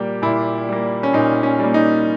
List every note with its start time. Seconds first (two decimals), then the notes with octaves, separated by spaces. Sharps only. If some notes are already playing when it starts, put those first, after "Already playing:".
Already playing: A#2 G3 A#3 G4
0.22 A#2 E4
0.69 G3 A#3
1.03 C#4
1.13 A#2 D#4
1.43 C#4
1.59 G3 A#3
1.74 D#4